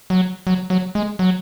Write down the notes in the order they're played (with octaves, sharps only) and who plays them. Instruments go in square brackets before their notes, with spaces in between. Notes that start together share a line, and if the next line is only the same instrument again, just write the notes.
[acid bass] F#3
F#3
F#3
G#3
F#3